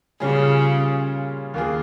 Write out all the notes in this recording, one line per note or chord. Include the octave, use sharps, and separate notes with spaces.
A#2 C#3 G3 C#4 F4 G#4
D#2 D#3 A#3 F4 G#4